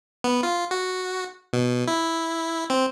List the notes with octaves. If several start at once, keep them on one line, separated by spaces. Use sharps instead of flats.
B3
F4
F#4
B2
E4
C4